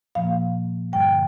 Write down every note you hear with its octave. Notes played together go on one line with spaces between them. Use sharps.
A#2 F3 A#3 F5
G2 D3 G3 G5